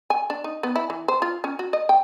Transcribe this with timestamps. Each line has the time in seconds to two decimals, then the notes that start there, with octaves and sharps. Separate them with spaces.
0.10 G#5
0.30 D4
0.44 D#4
0.63 B3
0.76 E4
0.90 E3
1.08 C5
1.22 F4
1.44 C#4
1.59 F#4
1.73 D#5
1.89 G5